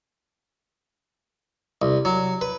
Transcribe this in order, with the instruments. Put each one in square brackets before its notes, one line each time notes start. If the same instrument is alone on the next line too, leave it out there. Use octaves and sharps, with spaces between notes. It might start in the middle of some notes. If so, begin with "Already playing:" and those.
[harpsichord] C2
F#3
B4